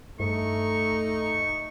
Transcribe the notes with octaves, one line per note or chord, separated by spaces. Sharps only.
G2 A3 D#4 C#6